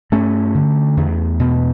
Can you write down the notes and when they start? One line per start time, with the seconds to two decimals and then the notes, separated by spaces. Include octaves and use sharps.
0.12 G2 A3 C#4
0.55 D3
0.97 E2
1.40 B2